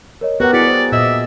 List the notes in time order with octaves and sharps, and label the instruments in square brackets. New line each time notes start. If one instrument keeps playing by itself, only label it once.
[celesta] A#4 C#5 D#5
[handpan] B3 G4 A#4 [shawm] F#4 [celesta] B4 F#5
[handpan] B3 F#4 G#4 [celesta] E4 B6 C#7 [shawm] D5
[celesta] C5
[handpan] A#2 D#5 [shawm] E5